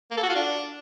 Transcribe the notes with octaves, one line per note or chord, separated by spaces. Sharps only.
A#3
A4
F#4
F4
D4